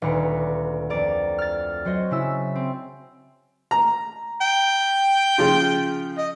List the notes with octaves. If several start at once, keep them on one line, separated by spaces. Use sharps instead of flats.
D#1 D2 B4 A#5 C#7
F2 D5 A#5
F6 A6
F#3 F#4 C5 D#5
C#3 E4 E6
C4
A#5
G5
C#3 F3 F4
D#5